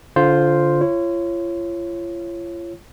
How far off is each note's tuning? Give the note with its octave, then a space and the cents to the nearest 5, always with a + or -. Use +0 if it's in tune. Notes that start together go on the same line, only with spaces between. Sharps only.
D3 -20 F4 +0 C5 +0
F4 -40 C#5 -15